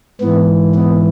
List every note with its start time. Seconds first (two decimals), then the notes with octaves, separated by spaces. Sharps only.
0.21 G#2 E3 B3
0.75 B3